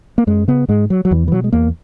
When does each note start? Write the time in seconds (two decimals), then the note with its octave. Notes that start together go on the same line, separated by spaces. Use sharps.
0.18 A#3
0.27 F#2 G#3
0.48 C#3 B3
0.69 G#2 G#3
0.90 F#3
1.05 F#3
1.11 E2 E3
1.28 E3
1.31 B2 F#3
1.44 G#3
1.53 E2 A#3